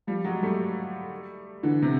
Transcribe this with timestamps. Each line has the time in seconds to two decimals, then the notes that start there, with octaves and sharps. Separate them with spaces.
0.07 F3 G3
0.24 F#3 G#3
0.43 G3 A3
1.63 D3 E3
1.82 C3